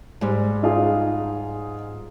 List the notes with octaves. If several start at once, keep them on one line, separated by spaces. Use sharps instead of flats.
G#2 G3
D#4 F4 G#4